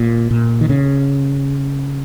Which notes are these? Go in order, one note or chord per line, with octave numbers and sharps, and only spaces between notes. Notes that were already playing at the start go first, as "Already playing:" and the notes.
Already playing: A#2
A#2
D#3
C#3